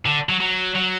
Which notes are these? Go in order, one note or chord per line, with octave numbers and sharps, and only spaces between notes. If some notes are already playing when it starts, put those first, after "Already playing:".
D3
F#3
F#3
F#3